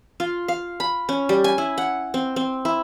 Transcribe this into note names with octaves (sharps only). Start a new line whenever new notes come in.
F4
F5
B5
C#4
G3
G#5
E4
F#5
C4
C4
E4